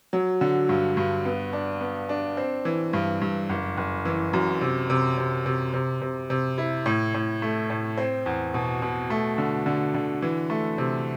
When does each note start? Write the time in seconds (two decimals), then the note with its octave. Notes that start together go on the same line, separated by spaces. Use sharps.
0.13 F#3
0.41 D3
0.69 G2
0.97 G2
1.25 B3
1.53 D4
1.81 B3
2.09 D4
2.37 C4
2.65 E3
2.93 G2
3.21 G2
3.49 F#1
3.77 F#1
4.05 E3
4.33 F#2
4.61 C3
4.90 C3
5.17 C3
5.46 C3
5.73 C3
6.02 C3
6.30 C3
6.58 E4
6.86 A2
7.14 A2
7.42 A3
7.70 A2
7.98 C4
8.26 E2
8.54 B2
8.82 B2
9.10 A3
9.38 D3
9.66 D3
9.94 D3
10.22 E3
10.50 A3
10.78 C3